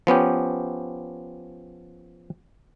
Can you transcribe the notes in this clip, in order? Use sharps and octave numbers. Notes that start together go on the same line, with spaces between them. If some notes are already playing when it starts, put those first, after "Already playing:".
F3 B3 C#4 G4